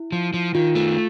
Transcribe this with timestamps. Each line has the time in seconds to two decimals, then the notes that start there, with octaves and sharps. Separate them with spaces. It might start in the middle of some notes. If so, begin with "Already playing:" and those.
Already playing: E4
0.12 F3
0.34 F3
0.55 D#3 F4
0.75 A3